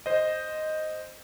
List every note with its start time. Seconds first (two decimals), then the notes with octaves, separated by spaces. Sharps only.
0.06 C5 D#5